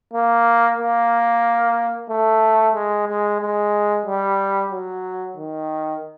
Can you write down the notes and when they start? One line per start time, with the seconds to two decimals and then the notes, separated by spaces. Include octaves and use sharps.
0.13 A#3
0.79 A#3
2.10 A3
2.75 G#3
3.08 G#3
3.41 G#3
4.06 G3
4.72 F#3
5.37 D#3